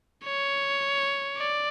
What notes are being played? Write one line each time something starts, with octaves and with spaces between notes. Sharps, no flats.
C#5
D5